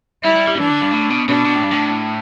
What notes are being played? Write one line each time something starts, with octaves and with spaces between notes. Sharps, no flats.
G3 E4
G3
G3
E3 D4
D3
G2
A2
B2
B2 D4
B2
A2
G2
A2